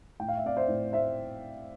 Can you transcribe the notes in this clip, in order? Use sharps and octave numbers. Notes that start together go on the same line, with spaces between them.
A2 G5
F5
E5
C4 D5 F5
C5 E5
A2
A2 C5 E5